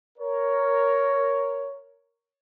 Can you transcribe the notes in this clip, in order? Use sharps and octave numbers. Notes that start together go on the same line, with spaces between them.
A#4 C#5